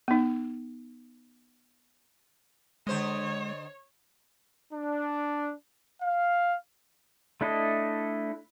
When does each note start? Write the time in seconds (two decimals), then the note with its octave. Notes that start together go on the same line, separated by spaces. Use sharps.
0.08 B3 D#4
2.87 D3 G#3 C5 C#5 D#5
4.73 D4
6.02 F5
7.41 A3 D4 E4 A4 D#5